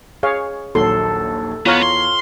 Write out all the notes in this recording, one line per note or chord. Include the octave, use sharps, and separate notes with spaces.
G#4 C#5 F5
A#1 D#2 F#3 A4 C6
E2 B3 F4 C#5 A#5 F6
C6